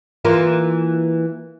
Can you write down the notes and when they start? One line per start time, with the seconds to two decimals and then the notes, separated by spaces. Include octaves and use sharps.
0.25 E3 A#3 F4